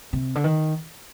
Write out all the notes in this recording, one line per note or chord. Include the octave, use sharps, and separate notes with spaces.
C3
D3
D#3